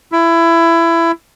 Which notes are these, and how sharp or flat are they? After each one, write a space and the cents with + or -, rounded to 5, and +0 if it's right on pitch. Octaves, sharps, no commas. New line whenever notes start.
E4 +20